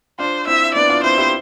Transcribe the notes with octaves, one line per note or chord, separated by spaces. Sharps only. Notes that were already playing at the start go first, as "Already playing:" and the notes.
D4 F4 C5
C4 E4 E5
B3 D4 D5
D4 F4
C4 E4 C5
E4 G4